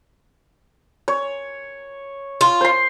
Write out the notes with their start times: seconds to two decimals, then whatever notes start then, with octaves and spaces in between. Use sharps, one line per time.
1.08 C#5
2.41 F4
2.61 C5 C6